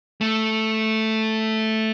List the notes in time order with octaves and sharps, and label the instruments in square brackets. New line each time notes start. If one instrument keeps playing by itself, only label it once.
[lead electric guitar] A3